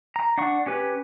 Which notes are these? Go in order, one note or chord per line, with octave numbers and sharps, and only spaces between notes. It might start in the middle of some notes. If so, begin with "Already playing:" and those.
A#5
D4 F#5 C#6
C#4 G4 B4